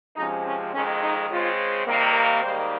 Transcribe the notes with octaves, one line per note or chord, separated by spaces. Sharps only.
C3 F3 G#3 C#4 D#4
C#4
F2 D#3 G#3 C#4
D#4
C#3 G#3 C4 F4
C3 D#3 G3 A#3
A#4
G#2 D#3 G3 A#3 C5